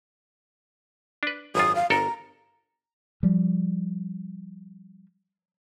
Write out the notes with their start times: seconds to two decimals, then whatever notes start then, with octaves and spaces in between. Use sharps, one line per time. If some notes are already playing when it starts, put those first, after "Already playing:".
1.23 D4 B4
1.55 G#1 F#2 F4 D#6
1.75 F5
1.90 G1 A4 A#4 A#5
3.23 F3 G3